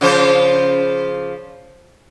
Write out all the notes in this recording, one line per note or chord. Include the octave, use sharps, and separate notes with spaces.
C#3 F3 C5